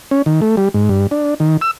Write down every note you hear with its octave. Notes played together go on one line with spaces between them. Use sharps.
C#4
D#3
A3
G3
G#2
G2
D4
D#3
E6